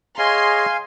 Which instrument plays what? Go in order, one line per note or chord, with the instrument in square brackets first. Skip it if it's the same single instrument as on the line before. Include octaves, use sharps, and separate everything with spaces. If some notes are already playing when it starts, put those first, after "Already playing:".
[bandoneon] G#4 C#5 D#5 [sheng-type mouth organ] F5 G#5 [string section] C6